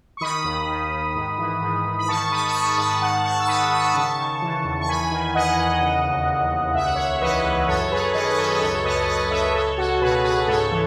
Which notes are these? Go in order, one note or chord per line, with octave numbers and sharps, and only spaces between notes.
C#6
D#3 B5 D#6
D#2
D#3
D#3
G#2
E3
G#2
G#2
B5
D#3 A5 C#6
D#3 B5 D#6
C#6
D#3 B5 D#6
G#2 A5 C#6
D#3 F#5 A5
D#3 A5 C#6
E6
D#3 B5 D#6
D#3 D#6
C#6
B5
C#3 A5 C#6
C#3
E3
E2
C#6
E2 G#5 B5
D#3
D#3 D#5 F#5
E2
C#3
D#2
D#2
D#2
C#2 E5
F#5
C#2 C#5 E5
E3 B4 D#5
C#2
F#2 A4 C#5
F#2 G#4 B4
D#3 B4 D#5
B4
F#2 A4 C#5
D#5
C#2 A4 C#5
C#2 B4 D#5
C#2 B4 D#5
C#2 C#5 E5
C#2 A4 C#5
C#2 F#4 A4
B2 G#4 B4
C#2 G#4 B4
G#2 A4 C#5
E3